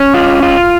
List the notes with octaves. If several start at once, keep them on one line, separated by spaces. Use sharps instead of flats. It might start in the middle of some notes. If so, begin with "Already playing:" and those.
Already playing: C#4
F4
F4